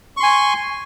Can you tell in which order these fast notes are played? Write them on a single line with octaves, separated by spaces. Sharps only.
C#6 C6 G#5